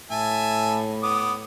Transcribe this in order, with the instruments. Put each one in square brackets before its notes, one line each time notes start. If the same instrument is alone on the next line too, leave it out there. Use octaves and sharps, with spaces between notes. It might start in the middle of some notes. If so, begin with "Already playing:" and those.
[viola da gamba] A2 [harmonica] E5 G#5 A5
[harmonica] B3 D6 D#6